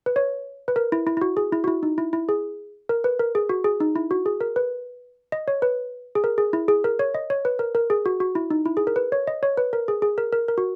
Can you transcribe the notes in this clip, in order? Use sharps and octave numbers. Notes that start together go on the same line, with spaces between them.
B4
C#5
B4
A#4
E4
E4
E4
F#4
G#4
E4
F#4
E4
D#4
E4
E4
G#4
A#4
B4
A#4
G#4
F#4
G#4
D#4
E4
F#4
G#4
A#4
B4
D#5
C#5
B4
G#4
A#4
G#4
E4
G#4
A#4
C#5
D#5
C#5
B4
A#4
A#4
G#4
F#4
F#4
E4
D#4
E4
G#4
A#4
B4
C#5
D#5
C#5
B4
A#4
G#4
G#4
A#4
A#4
A#4
F#4